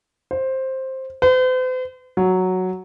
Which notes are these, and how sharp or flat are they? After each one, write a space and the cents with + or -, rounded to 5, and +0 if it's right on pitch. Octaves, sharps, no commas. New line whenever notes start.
C5 +10
C5 -45
F#3 +0